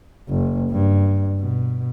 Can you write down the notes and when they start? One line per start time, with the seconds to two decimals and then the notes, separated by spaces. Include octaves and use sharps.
0.29 F#1
0.71 G2
1.39 B2